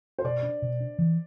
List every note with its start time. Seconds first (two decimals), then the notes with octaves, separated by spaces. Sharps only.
0.19 C5
0.24 B2 D5
0.43 D4
0.62 B2
0.80 D4
0.99 E3